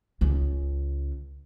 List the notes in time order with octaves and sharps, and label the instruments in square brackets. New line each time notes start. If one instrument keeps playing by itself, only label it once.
[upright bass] C#2 C#3